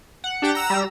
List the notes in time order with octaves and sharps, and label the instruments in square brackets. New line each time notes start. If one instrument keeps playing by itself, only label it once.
[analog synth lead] F#5
[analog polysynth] D4 G4 G5
A#5 E6
[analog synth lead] G3